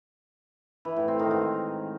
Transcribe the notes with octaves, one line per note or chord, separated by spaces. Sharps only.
E3
A2
C4
D#3
G#2